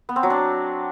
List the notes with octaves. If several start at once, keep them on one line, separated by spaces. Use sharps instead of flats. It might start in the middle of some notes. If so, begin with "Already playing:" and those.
B3
C4
F#3
D4